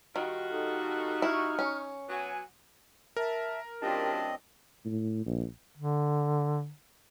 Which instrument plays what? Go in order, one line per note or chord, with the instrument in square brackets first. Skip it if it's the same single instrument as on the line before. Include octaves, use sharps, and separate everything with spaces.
[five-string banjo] D#3 [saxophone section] G3 F4 F#4
[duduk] D#4 [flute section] A4
[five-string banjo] E4 [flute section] C#6 F6
[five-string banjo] C#4
[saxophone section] F#3 B3 F#4 [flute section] G#5
[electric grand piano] A#4 [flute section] E5 A5
[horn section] F#2 A2 D4 [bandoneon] C4 D#5 [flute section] F4 G4 C6
[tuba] A2
A#1
[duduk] D3